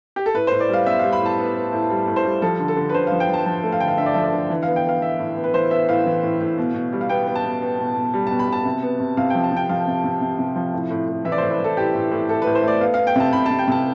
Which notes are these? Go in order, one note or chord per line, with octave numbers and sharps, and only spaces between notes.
G4
A4
A2 B4
A2 C5
D5
G3 F5
B3 E5
G3 F5
B5
A2 A5
B3
B3
A2
G3
A2
C5
G3
F3 A4
D3
A4
D3
B4
D3 C5
F3 F5
G5
F3 A5
F3 A5
A3
F5
D3 G5
F5
D3 E5
D5
F3 E5
D5
D3
E3
B3 F5
G5
B3 F5
B3 E5
A2
B3
B4
E3 C5
B3 E5
A2 F5
E3
A2
A2
B2
B2
G3
F5
B3 G5
B3
A5
B2
B3
B2
B2
G3
B2 A5
B5
B2 A5
C3
B3
C3
C3 F5
F3 G5
A5
C3 G5
F3 F5
C3
C3
C3
C3
F3
A2
A2
A2
E3 E5
D5
A2 C5
B4
E3 A4
A2 G4
A2
A2
A2 A4
A2 B4
C5
A3 D5
B3 F5
B3 F5
G5
C3 A5
C3 B5
C3 A5
G5
C3 A5